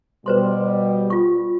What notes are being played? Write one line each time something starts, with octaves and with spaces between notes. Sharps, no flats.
B2 G3 B4 C5 C6
F4 C#6